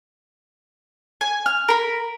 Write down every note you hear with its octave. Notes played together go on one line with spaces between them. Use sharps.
G#5
F6
A#4 B5